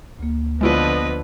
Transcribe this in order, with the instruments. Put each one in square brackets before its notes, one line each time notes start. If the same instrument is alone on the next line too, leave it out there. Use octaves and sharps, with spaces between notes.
[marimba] D2 A#3
[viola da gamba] D3 F3 B4 [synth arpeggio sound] G#3 E4 F4 [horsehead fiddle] B3 D#5